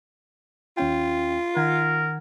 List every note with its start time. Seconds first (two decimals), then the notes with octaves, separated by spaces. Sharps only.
0.77 D#2 C#4 F4 G5
1.57 D#3 A#4 F#5 G#6